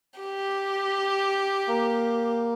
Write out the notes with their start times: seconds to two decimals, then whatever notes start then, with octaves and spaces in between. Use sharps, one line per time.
0.20 G4
1.68 A#3